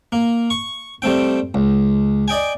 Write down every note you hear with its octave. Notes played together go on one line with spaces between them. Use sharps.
A#3
C#6
G3 A3 C4 G5
C#2
D5 D#5 G5 G#5